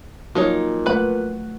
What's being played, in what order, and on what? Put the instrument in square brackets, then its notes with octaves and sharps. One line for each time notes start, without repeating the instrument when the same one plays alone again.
[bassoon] A#2 [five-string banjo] F3 D#4 C#5 [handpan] F#4
[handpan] F3 A3 F#5 [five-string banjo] B4 B5